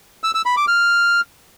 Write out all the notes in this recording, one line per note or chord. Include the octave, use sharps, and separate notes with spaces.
E6
E6
B5
D6
F6